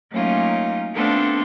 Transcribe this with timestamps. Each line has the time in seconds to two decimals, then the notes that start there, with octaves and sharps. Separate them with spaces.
0.12 F#3 A3 A#3 C#4 D#4 F4
0.94 A3 B3 C4 D4 F4 A4